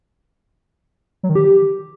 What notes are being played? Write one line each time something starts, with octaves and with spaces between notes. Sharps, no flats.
F#3
D#3
G4